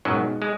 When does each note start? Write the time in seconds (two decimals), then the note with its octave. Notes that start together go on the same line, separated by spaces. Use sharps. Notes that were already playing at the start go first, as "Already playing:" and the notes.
0.05 F#2 B2 F#3 G#3 D#4 F#4
0.42 G#3